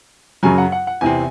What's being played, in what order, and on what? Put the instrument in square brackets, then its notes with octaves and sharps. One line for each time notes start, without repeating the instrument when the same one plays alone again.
[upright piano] F#2 C#3 F#3 G#5
F#5
F#5
F#5
E2 C3 E3 C4 G#5